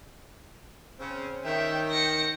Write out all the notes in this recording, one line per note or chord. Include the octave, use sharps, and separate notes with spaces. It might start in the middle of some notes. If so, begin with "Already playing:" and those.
C#3 C4 C#4
D#3 C#5 E5 G5
A#6 C#7